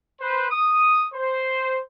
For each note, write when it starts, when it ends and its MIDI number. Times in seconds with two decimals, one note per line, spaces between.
0.20 0.46 71
0.20 0.46 72
0.50 1.04 87
1.14 1.79 72